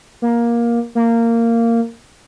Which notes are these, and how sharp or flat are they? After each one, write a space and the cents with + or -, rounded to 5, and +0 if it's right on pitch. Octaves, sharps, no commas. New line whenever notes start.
A#3 +15
A#3 -15